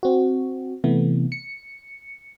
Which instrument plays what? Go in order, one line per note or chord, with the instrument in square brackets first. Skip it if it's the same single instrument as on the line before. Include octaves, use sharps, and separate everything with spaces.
[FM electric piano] C4 F#4
C3 E3 A3 B3
C#7